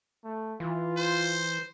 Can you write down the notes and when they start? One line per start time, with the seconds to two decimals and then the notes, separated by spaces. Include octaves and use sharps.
0.25 A3
0.60 E3 F4
0.97 C5